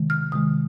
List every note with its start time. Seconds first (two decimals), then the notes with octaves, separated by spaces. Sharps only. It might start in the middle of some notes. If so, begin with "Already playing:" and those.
Already playing: C3 D#3 G#3
0.10 F6
0.32 C3 D#3 G#3 D#6